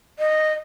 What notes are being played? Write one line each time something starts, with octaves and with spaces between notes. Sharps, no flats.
D#5